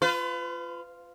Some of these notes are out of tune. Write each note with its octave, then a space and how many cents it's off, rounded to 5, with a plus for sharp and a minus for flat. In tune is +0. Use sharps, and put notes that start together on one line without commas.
F4 -5 B4 +35